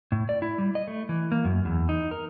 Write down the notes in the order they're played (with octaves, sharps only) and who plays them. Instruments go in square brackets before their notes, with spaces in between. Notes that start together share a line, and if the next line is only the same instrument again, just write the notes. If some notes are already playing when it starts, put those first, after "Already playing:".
[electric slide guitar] A2
D5
E4
G3
D#5
A3
E3
A#3
F#2
E2
D#4
A#4